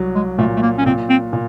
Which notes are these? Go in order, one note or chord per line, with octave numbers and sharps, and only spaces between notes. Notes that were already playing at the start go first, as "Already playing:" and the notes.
Already playing: C2 F#3
G#3
A#2 A3
A3
A#3
C#4
A#2 C4
C4
A#2